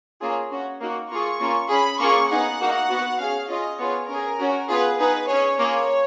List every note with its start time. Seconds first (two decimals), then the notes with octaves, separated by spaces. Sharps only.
0.21 A#3 C#4 F4 G#4
0.50 C#4 F#4
0.81 A#3 D#4 F#4
1.10 A#3 F4 G#4 C#6
1.40 A#3 C#4 F4
1.70 C#4 G#4 B5
2.00 A#3 C#4 F4 G#4 C#6
2.30 B3 D#4 G#4 F#5
2.60 A#3 D#4 F#4
2.89 B3 F#4
3.20 C#4 G#4 F5
3.49 C#4 F4 G#4 D#5
3.80 B3 F4 G#4 C#5
4.09 C#4 G#4 A#4
4.40 C#4 F#4
4.69 B3 F4 G#4 B4
4.99 B3 D#4 G#4 B4
5.28 C#4 G#4 C#5
5.58 A#3 F4 G#4 C#5